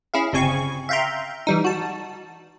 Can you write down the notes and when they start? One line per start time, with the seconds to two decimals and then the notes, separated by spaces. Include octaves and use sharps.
0.14 C#4 E4 G#4 F5
0.33 G1 C#3 C4 G#5 C#6
0.89 E5 F5 G5 A#5 C6
1.47 E3 G3 D#4
1.65 F#4 A5